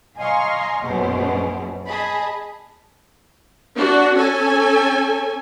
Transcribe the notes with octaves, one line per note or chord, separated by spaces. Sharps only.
D#5 F5 G#5 A#5 C6 C#6
A#1 F#2 B2 G#4 C5
G#4 D#5 A5 B5
D4 F#4
C#4 A4 G#5